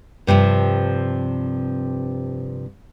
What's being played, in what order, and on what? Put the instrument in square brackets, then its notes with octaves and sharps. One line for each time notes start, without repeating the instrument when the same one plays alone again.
[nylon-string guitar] G2 C3 F3 C4